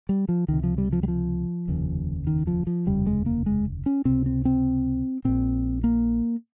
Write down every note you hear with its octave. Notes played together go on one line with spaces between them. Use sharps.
G3
F3
C#2 C3 D#3
F3
G3
F3
G3
F3
F1 D#2 C#3
D#3
F3
F3
F1 D#2 C#3 G3
G#3
A#3
G#3
C#4
C#2 C3 C4
C4
C4
A#1 A#2 C4
A#3